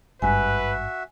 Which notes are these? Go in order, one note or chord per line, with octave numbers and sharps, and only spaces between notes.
G#1 G2 F#4 B4 E5 G#5